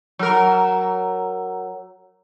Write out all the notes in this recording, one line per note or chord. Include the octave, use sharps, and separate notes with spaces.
F#3 A#4